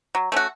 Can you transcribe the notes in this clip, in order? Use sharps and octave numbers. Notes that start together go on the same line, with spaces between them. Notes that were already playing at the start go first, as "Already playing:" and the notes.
F#3
A3 C#4 F#4